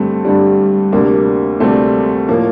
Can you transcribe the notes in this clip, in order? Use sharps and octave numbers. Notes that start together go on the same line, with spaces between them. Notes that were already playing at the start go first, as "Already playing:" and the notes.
Already playing: G2 D3 G3 A3 C4
G2 D3 G3
D2 C3 G3 A#3 D4
D2 C3 G3 A3 C4
A2 F3 A#3